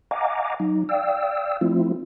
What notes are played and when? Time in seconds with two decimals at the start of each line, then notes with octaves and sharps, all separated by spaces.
0.11 D#5 F5 F#5 G#5 A#5 D6
0.60 F#3 D#4
0.89 D5 F5 G5 E6
1.61 F3 A3 C4 E4 F4